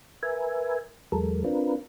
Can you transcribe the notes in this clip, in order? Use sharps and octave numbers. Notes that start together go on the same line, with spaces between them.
A#4 B4 E5 G#5
E2 F#3 G#3 A4 A#4
C4 D4 F4 A#4 B4